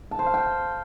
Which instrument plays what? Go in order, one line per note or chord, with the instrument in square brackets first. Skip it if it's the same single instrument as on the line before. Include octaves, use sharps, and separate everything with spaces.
[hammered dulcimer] A5
C5
F5
G5